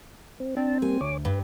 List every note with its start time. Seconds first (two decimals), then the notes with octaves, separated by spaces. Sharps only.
0.40 C4
0.57 C4 D4 A5
0.82 G3 A#3 G#5
1.01 D2 C#5 D6
1.25 G2 B4